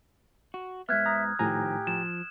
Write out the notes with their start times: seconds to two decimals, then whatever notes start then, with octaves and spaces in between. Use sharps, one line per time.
0.54 F#4
0.89 G#2 B3 E5 F6 F#6 G#6
1.06 A#5 D#6
1.39 A2 D#3 F3 G4 G#5 A#5
1.87 F3 E7